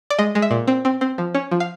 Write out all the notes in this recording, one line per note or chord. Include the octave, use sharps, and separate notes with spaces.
D5
G#3 D#5
G#3
E5
A#2
C4
C4
C4
F3
C#4
F3
F5